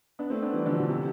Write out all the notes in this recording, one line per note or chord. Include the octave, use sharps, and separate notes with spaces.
B3 D4
A3 C4
B3 D4
E3 G3
D3 F3
B2
C3